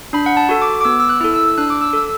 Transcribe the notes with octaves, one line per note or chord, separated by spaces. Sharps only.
D4 B5
F#5
A5
F#4 A4
D6
D6
B3 E6
E6
F#6
E4 A4
E6
E6
D4 F#6
D6
E6
A4